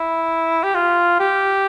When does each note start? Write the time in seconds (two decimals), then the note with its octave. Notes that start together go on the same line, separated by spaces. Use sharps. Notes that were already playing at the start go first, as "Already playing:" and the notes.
Already playing: E4
0.63 G4
0.75 F4
1.20 G4